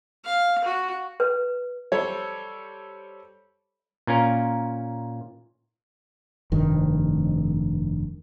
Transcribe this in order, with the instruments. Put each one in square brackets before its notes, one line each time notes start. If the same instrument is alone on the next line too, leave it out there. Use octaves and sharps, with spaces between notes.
[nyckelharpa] F5
F#4
[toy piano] B4
[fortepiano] G3 A4 C5 C#5
[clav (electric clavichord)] A#2 C#4 F4 A#4
[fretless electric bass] F1 G2 D#3